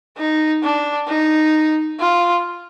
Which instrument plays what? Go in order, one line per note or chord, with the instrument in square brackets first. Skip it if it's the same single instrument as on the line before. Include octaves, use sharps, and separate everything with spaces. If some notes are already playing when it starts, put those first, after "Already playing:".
[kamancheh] D#4
D4
D#4
F4